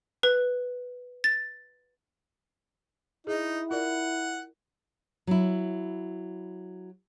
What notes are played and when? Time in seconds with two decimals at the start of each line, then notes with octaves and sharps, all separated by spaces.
0.23 B4
1.24 A6
3.27 D#4 E4 G#4 D#5
3.71 F4 A#4 D5 F#5
5.27 F#3 E4